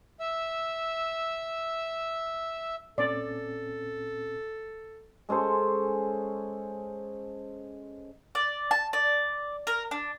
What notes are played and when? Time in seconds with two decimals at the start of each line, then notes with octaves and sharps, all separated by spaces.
0.20 E5 E6
2.98 A#2 C4 C#4 A4 D5
5.29 G#3 C#4 A4 C5
8.35 D5
8.71 A5
8.93 D5
9.67 A#4
9.91 D4